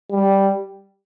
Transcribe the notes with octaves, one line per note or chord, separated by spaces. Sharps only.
G3